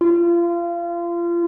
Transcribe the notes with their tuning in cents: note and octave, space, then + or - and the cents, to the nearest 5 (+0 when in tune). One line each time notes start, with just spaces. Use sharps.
F4 -30